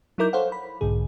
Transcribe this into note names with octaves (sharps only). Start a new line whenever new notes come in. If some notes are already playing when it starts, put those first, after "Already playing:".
F#3 D#4 E4 A#4 D6 G6
A4 C5 C#5 F5 F#5
B5
B1 G#2 D3 G#4